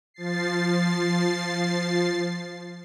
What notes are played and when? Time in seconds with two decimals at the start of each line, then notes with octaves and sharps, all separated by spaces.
0.14 F3 A6 C7